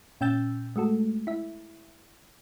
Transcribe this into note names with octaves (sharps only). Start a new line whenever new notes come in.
A#2 C#4 G5 E6 G6 A6
G#3 A3 F#4 A4
E4 E5